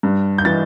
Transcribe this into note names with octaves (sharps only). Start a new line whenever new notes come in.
G2
G6
E3 A6